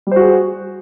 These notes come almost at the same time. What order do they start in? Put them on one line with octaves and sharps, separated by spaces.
G3 C5 F#4 G#4